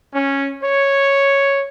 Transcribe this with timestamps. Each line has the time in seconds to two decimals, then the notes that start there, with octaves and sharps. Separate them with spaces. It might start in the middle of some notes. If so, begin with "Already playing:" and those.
0.13 C#4
0.62 C#5